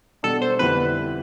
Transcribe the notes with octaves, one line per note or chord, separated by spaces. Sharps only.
B2 G3 D4 G4 A4
C5
F2 D3 G3 B3 E4 B4